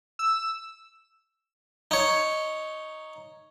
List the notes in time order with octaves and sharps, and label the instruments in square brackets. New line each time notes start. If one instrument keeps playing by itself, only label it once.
[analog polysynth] E6
[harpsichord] D#4 C#5